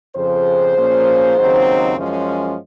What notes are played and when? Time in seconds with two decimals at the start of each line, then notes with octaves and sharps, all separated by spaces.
0.16 F2 C#3 F3 G#4 C5
0.77 A#2 F3 A#3 C#4
1.37 D#2 C#3 F#3 C4 D#4
1.97 F#2 F3 G#3 C#4